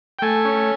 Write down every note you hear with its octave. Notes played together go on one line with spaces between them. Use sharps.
G5
A3 G#5
C#4